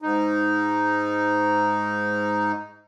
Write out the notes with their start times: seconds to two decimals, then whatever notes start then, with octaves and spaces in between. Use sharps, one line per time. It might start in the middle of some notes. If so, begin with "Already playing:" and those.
0.02 G#2 D#4